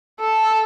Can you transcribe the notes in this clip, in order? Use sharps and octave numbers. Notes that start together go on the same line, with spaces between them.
A4